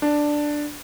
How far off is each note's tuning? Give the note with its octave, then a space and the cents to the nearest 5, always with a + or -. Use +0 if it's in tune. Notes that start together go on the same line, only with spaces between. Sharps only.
D4 +5